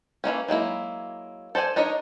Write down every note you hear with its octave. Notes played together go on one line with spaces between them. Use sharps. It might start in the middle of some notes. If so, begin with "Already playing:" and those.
E3 G#3 A#3 C#4
F#3 G#3 A#3 E4
A4 C5 D5 G#5
D4 D#4 A#4 C#5 D#5